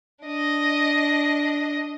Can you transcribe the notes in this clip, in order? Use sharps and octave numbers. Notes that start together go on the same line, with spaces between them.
D4 D#5